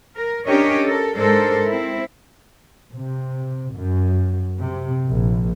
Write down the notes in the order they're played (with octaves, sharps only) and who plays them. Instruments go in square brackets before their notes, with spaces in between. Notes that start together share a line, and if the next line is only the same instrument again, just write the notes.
[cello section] A#4
C#4 D4 G4 A#4 C#5 D#5
A4 A#4
G#2 G#3 D4 A4 A#4 C5
C4 E4
[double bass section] C3
F#2
C3
A#1